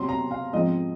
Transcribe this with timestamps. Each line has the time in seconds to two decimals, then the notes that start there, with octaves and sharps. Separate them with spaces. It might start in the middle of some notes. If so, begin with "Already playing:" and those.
Already playing: C3 F#3 C4 C6
0.09 A#5
0.31 F5
0.53 G#2 F3 C4 D#5